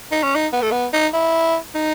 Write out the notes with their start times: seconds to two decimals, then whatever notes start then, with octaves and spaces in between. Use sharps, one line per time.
0.12 D#4
0.23 C#4
0.35 D#4
0.53 B3
0.62 A3
0.72 B3
0.93 D#4
1.13 E4
1.75 D#4